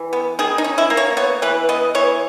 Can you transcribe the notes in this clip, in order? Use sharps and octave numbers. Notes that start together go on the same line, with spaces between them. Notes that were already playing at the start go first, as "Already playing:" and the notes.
Already playing: E3
B3
D#3 G#4
D#4
C#4
E4
A#3
C#5
B3 C#5
E3 B4
B3 D#5
E3 C#5